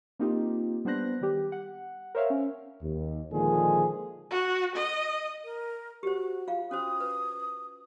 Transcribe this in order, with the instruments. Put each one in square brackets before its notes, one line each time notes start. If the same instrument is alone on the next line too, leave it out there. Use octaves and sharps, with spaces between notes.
[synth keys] A#3 C4 D#4 F4 G4
G3 B3 D4 C5 F#6 A#6
D#3 G3 G4
F#5
A#4 C5 C#5 E5 F5
C#4
[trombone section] D#2
A#2 D3 D#3 F3 G#3 G#4
[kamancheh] F#4
D#5
[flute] A#4
[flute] F#4 [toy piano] G4 C5
[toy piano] F4 F5
[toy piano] C#4 F#4 C5 [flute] D#6
[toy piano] B4